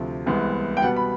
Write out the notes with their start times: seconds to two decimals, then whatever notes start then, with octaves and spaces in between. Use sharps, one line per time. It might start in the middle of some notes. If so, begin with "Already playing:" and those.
Already playing: D2 C3 F3
0.26 C2 C3 E3 G#3 B3
0.77 G5
0.82 B2 G3 B3 F#5
0.96 B5